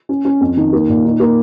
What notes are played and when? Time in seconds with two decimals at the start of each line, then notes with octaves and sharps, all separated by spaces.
0.09 C#4
0.25 C#4
0.41 F2
0.57 D#3
0.73 A#3
0.89 A#2
1.05 D#4
1.20 A#3